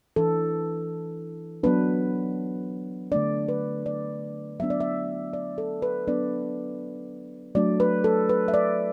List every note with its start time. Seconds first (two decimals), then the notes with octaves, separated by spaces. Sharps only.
0.16 E3 D4 A4
1.64 F#3 B3 D4 B4
3.12 D3 A3 D4 D5
3.48 B4
3.86 D5
4.60 F#3 B3 D4 E5
4.70 D5
4.80 E5
5.33 D5
5.58 A4
5.82 B4
6.08 F#3 B3 D4 D5
7.55 F#3 A3 D4 D5
7.80 B4
8.04 A4
8.29 B4
8.48 E5
8.54 D5